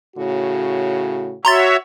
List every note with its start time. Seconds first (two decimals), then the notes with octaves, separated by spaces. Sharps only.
0.16 A2 C#3 F#4
1.45 F#4 C#5 E5 A#5 C6 A6